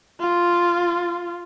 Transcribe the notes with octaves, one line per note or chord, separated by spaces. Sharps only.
F4